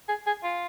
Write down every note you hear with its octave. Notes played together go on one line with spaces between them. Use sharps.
G#4
G#4
F4